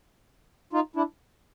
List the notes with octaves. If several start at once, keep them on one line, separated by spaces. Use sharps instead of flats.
D#4 F4
D4 E4